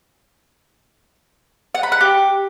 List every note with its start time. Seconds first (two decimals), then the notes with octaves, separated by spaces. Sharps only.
1.75 F#5
1.83 B5
1.92 F#5
2.01 G4